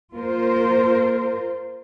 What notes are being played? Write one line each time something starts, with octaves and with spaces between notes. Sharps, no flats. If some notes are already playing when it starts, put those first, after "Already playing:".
A#3 F4 A#4 C5